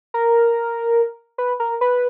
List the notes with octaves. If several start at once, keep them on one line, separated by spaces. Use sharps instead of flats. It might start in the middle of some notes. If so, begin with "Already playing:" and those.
A#4
B4
A#4
B4